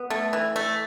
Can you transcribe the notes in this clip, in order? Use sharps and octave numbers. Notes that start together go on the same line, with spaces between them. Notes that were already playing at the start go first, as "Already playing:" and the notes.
Already playing: B3
A3
E3
A3